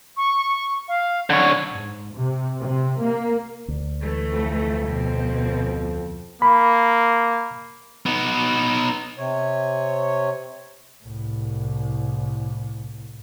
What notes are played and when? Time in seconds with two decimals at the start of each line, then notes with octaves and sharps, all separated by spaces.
0.17 C#6
0.88 F5
1.30 D3 C#5 F#5
1.71 G#2
2.15 C3
2.60 C3
3.00 A#3
3.68 D2
4.01 E3 A3
4.32 F2
4.86 B2 F3 C4
6.42 A#3 B5
8.06 B3 D#4
9.18 C3 C#5
11.03 C2 A2